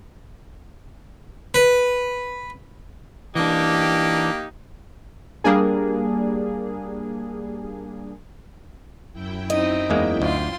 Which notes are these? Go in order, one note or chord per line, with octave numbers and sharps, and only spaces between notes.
B4
E3 A#3 D4 D#4 G4
G3 A#3 D4 G#4
F#2 E4 G5
C4 D#4 D#5
E2 G#3 A#3
D2 F4 C6